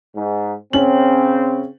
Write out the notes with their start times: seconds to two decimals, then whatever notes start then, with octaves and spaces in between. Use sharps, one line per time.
0.16 G#2
0.73 C#3 C4 C#4 F#7